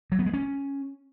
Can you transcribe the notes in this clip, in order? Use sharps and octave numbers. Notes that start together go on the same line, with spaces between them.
F#3
B3
G#3
C#4